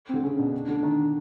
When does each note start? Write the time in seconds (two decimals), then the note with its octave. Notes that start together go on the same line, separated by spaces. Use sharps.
0.09 D3 C4
0.23 C#3 C#4
0.38 B2 D4
0.68 D3
0.83 D#3